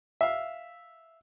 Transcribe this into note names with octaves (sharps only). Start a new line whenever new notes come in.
E5 F5